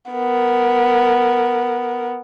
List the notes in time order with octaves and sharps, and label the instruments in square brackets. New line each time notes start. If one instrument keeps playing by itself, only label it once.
[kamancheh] B3 A#4